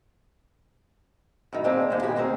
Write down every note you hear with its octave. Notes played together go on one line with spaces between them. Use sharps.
F#2 A2 D#3
G#3 A#3 C4 D4 G4
D#2 G#3
G#2 B2 G4 D#5 G5 G#5
D2 G#3 A#3 C4 G#4 A#4